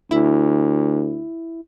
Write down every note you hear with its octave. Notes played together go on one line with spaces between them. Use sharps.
D2 E4